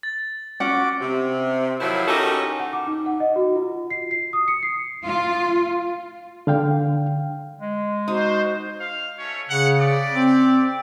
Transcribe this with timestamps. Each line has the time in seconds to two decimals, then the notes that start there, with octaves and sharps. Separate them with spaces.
0.03 A6
0.60 C#4 F#4 F#5 D6
1.01 C3
1.80 D#3 F3 F#3 E4
2.08 C#4 D#4 F#4 G4 A4 A#4
2.59 F#5
2.73 D6
2.87 D#4
3.06 F#5
3.20 D#5
3.36 F#4
3.56 F4
3.90 C7
4.11 C7
4.33 D#6
4.48 C#7
4.63 C7
5.05 F4
6.47 D3 F5 G5
7.60 G#3
8.08 D#4 F#4 C5
8.79 F5
9.19 A3 C#4 C#5
9.50 C#3 F#5
9.80 G4 D5
10.13 C4